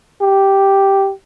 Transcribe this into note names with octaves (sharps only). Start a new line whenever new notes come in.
G4